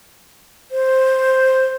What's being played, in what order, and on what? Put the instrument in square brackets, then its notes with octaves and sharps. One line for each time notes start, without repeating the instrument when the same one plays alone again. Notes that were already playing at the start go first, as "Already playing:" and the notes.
[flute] C5